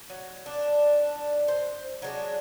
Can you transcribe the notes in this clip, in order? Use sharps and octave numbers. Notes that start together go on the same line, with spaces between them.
F#3
D4
C5
F#3 G#3 D4